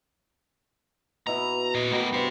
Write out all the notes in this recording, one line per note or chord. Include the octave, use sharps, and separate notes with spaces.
B2 E4 A#5
A#2 D#5
B2 A3 G4 A#4 B5
G2 G4 C5